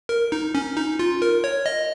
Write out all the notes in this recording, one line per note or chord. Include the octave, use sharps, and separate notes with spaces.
A#4
D#4
C#4
D#4
F4
A#4
C#5
D#5